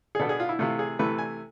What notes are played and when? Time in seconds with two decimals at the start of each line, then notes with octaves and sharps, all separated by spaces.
0.15 G#4
0.19 B2 B3 D4 A4
0.29 G#4
0.40 F4
0.49 E4
0.59 C3 E3 A3 F4
0.79 G#4
0.99 C3 E3 A3 B4
1.18 G#5